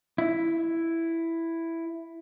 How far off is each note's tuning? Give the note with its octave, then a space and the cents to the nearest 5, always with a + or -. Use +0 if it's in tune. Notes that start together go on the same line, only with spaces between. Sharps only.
E4 +5